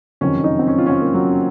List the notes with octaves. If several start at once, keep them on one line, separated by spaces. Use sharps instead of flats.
F#1 F2 C3 D#3 C#4
D#4
C4
C#4
F4
C#4
C4
A#3
F#3